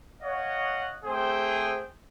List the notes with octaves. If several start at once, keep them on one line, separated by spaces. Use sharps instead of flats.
C#5 D#5 F5 F#5
A3 C4 G#4 C5 G5